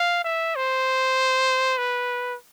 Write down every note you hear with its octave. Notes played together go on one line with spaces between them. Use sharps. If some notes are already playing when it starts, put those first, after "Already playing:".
Already playing: F5
E5
C5
B4